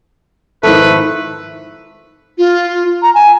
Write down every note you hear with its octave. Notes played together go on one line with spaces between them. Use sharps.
F2 G#2 D#3 A3 E4 A4 B4
F4
A#5
G#5